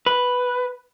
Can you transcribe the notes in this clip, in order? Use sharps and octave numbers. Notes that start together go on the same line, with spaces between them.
B4